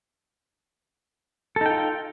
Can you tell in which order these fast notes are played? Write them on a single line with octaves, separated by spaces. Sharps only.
A4 D#4 G5 F4